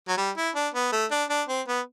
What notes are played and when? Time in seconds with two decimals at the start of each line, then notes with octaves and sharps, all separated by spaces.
0.08 F#3
0.18 G3
0.37 E4
0.55 D4
0.74 B3
0.92 A3
1.11 D4
1.30 D4
1.48 C4
1.68 B3